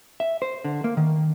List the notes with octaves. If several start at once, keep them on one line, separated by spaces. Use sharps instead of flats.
E5
C5
D3
A#3
D#3